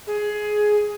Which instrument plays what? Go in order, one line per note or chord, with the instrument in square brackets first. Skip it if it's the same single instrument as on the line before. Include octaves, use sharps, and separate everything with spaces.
[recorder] G#4